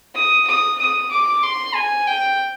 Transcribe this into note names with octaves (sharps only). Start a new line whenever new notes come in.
D#6
D#6
D#6
D6
C6
G#5
G5